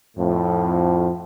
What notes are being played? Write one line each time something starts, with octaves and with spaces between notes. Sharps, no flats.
F2 A2